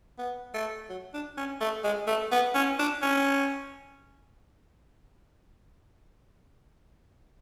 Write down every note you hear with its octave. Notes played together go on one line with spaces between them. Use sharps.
B3
A3
F#3
D4
C#4
A3
G#3
A3
B3
C#4
D4
C#4